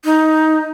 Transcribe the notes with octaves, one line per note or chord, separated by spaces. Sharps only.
D#4